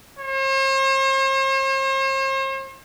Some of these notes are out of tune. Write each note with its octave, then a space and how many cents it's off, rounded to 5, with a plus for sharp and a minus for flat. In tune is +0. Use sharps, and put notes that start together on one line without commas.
C5 +45